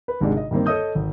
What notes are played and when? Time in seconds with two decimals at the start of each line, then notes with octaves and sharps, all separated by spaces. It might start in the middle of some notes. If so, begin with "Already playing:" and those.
0.08 B4
0.20 G#1 G#2 C3 G#3 D4
0.37 D#5
0.51 G2 D#3 A#3 C4
0.66 A4 C#5 D#5 D#6 G6
0.95 G#1